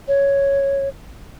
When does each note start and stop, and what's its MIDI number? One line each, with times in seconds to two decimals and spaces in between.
0.08 0.89 73